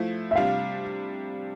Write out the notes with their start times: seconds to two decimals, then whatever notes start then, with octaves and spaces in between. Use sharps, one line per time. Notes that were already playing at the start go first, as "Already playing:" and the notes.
Already playing: F3 A3 E4
0.31 E5
0.36 C3 G3 D4 F4 F5